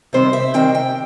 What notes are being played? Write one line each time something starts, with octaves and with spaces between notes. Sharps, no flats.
C3 D#3 G3 C4 C5
E5
C3 D#3 G3 C4 G5
G5